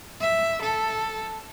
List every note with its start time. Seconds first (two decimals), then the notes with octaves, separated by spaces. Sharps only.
0.20 E5
0.61 A4